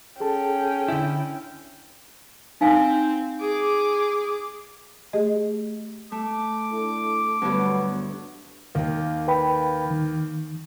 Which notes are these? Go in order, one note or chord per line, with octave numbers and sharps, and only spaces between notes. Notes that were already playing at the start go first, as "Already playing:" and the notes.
C#4 G#4 A4 G5 A5
D3 E4
C4 D#4 F5 G#5
G#4 D6
A3 G4 G#4 D#5
A3 D6
D4 E4 A4
D2 G2 F#3 B3
D#2 A#3
B4 G5 B5
D#3